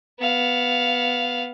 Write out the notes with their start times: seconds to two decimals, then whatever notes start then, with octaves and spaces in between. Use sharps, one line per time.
0.20 B3 F5